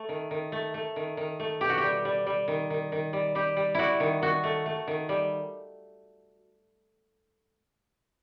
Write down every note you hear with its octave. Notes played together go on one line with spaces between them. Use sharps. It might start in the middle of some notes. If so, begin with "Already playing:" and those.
Already playing: A3
D#3
D#3
A3
A3
D#3
D#3
A3
B2 G4
F#4
G4
G3
G3
G3
D#3
D#3
D#3
G3
G3 G4
G3
G3 E4 F#4
D#3
D#3 F#4
A3
A3
D#3
G3